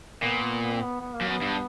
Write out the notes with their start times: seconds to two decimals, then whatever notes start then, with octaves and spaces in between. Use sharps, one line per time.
0.22 A#2 B3
0.62 B3
0.73 C4
0.83 B3
1.01 B3
1.15 A#3
1.21 F#2
1.28 B3
1.42 G2